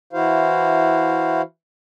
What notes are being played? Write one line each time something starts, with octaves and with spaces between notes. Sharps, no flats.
E3 E4 F#4 C5 F5